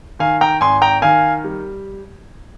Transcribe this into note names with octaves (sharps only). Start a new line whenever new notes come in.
D#3 F5 G#5
G5 A#5
G#1 G#5 C6
G5 A#5
D#3 F5 G#5
G3